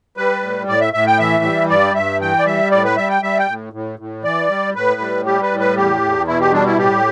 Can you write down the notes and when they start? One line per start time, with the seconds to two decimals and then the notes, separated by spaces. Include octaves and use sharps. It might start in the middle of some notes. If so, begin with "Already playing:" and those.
0.17 G3 B4
0.42 A2
0.68 A2 D5
0.81 E5
0.93 A2 E5
1.07 G5
1.19 E3 E5
1.44 G3
1.70 G2 D5
1.95 G2 E5
2.21 E3 G5
2.39 D5
2.46 G3 E5
2.71 A2 D5
2.85 B4
2.97 G3 E5
3.09 G5
3.22 G3 E5
3.39 G5
3.48 A2
3.73 A2
3.99 A2
4.24 E3 D5
4.49 G3
4.75 A2 B4
5.01 G3
5.25 G3 G4
5.43 B4
5.51 A2
5.59 B4
5.76 E2 G4
6.02 E2
6.27 B2 E4
6.41 G4
6.52 G3 D4
6.66 E4
6.78 A2 G4